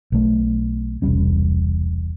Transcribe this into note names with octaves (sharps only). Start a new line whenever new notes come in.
B1 A3
E1 C2 G3 C#4